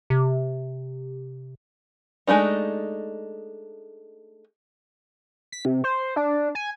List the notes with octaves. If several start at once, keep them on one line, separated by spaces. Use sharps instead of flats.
C3
G#3 A3 D4 D#4
B6
C3
C5
D4
G#5